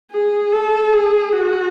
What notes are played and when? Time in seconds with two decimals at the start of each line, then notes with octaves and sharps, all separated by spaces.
0.12 G#4
0.53 A4
0.93 G#4
1.33 F#4